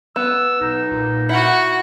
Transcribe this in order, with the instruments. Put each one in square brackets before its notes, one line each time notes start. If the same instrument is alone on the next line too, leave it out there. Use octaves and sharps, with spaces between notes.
[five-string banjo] B3 [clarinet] E6
[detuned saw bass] B1 [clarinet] D#4
[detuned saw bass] A#2
[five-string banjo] E4 [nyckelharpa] F#4 F#5